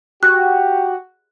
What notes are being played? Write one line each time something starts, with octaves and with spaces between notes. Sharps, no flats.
F#4 G4 F#6